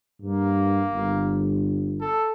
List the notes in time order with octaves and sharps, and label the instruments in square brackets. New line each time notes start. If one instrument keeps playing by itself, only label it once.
[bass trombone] G2 [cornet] A#3
[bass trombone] G1
[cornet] A4